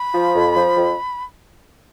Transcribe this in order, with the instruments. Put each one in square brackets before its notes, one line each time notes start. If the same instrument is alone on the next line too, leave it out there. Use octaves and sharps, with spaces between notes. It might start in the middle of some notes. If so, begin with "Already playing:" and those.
Already playing: [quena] B5
[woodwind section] F3
F2
F3
F2